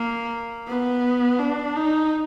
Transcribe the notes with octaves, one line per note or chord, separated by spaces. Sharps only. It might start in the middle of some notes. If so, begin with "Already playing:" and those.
Already playing: A#3
B3
D4
D#4